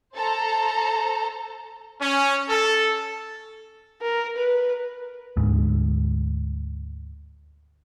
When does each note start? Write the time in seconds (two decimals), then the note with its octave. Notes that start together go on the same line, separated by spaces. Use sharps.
0.15 A4 C5 A5 A#5
2.02 C#4
2.49 A4
4.02 A#4
4.37 B4
5.37 D2 G#2 D3